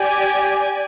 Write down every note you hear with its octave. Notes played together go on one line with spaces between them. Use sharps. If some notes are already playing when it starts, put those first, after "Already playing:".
Already playing: G4 D5 G#5